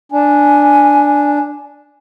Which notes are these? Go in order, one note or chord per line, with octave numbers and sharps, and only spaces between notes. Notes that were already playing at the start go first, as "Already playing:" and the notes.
D4 G#5